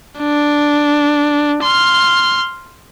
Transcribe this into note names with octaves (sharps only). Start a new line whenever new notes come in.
D4
C6 F6